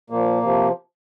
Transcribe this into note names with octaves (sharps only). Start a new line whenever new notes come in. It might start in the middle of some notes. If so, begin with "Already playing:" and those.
A#2 F3 A#3
C3 F3